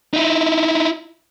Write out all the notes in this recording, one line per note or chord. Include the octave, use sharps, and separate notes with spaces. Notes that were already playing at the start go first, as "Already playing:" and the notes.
D#4 E4